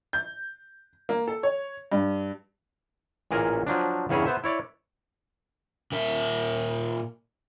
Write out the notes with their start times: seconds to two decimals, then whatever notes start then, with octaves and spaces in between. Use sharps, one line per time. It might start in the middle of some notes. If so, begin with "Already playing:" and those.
0.13 G6
1.09 A#3
1.28 A4
1.43 C#5
1.92 G2
3.31 A1 A#2 G#4 A#4
3.66 F3 F#3 D4
4.09 E2 G2 C#3 G#4 C#5 E5
4.26 B3 C5 E5
4.44 E4 C#5 D5
5.92 A#2 A#4 E5